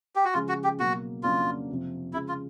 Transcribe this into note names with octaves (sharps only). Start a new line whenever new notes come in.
G4
F#4
C#3 F3 G#3 F4
F#4
G4
B2 F#3 A#3 F#4
F2 C#3 F#3 A#3 D4 F4
F2 C3 F3
C#3 F3 G#3 E4
F4